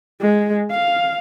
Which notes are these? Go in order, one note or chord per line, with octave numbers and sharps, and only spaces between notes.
G#3
F5